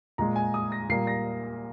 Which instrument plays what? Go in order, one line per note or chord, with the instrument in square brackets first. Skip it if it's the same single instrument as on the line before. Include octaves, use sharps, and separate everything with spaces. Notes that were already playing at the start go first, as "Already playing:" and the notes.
[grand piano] A#2 G#3 A#5
G#5
D#6
A#6
A#2 G3 A#3 C7
A#6